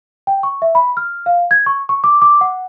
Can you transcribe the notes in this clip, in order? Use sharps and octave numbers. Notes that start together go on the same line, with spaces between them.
G5
C#6
E5
B5
F6
F5
G#6
C#6
C#6
D6
D6
F#5